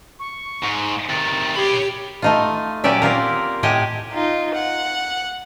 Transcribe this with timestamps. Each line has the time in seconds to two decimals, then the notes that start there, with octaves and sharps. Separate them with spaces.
0.19 C#6
0.63 G#2
1.09 C3 D#3 A6
1.56 G4 C#5 B5
2.22 A3 D#4 F4
2.84 A#2 F#3 C#4 G4 D5 E5
3.02 A#3 C4 F4 A#4
3.63 A2 G4 D#5 F#5 G#5
4.12 D#4 F4
4.55 F#5